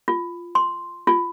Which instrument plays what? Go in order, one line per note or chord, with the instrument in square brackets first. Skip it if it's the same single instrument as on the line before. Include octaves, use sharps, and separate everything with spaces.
[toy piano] F4
C6
F4